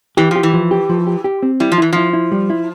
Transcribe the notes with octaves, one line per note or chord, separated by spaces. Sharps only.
E3 G4
F3 G4
E3
F3
G4
F3
G4
G4
C4
G3 E4
F3
E3 E4
F3 E4
E4
G3
E4